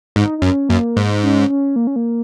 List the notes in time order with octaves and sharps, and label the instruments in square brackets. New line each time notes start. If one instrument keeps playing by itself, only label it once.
[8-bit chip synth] G#2 [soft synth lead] D#4
[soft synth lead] D#4
[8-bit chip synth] F#2 [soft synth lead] C#4
[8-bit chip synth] F#2 [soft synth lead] A#3
[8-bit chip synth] G#2
[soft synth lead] C#4
C#4
A#3
C#4
A#3